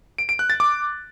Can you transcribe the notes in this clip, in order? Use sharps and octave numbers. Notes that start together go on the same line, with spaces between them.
D7
D7
F#6
A6
D6